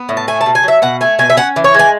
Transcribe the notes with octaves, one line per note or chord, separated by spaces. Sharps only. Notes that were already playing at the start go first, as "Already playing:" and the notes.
Already playing: B3
A2
A5
A3 G#5
A5
B2
G#5
F#3 E5
B2 F#5
A3 G#5
B2 G#5
E5
C#4 F#5
E3
C#5
G#3
G#5